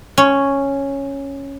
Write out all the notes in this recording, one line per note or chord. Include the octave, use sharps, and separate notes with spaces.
C#4